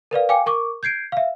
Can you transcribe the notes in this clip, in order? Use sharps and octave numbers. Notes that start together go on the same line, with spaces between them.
A#4 B4 D5 F5
F5 G5 G#5 D6 C#7
A#4 C#6 D6
G6 G#6 C7 D7
E5 F5